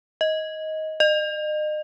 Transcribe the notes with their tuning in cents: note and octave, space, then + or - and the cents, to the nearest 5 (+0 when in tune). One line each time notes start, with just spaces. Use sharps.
D#5 +15
D#5 -35